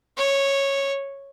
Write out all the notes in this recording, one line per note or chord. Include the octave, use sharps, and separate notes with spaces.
C#5